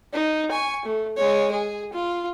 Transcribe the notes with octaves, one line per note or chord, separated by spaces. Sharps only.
D#4
G#5 C#6
A3
G#3 C#5
G#4
F4